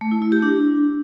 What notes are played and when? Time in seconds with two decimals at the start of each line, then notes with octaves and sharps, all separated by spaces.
0.01 A3
0.11 E4
0.22 E4
0.32 G4
0.42 D4